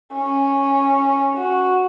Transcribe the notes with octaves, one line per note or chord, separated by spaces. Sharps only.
C#4
F#4